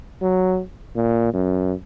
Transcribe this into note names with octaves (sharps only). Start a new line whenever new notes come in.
F#3
A#2
F#2